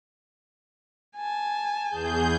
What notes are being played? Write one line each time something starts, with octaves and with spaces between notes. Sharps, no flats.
G#5 A5
E2 G#4 G6